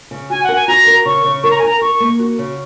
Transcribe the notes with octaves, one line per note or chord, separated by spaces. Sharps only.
C#3
F#4 G#5
F#5
A#4
G#5
F#4 A#5
A#4
C#3 C#6
C#3
A#4 C#6
A#5
G#5
A#4 A#5
A#4 C#6
A#3
F#4
C#3